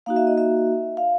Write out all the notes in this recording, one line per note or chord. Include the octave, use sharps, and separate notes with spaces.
A#3 D#4 F#4 F5
E5
D#5
E5
F5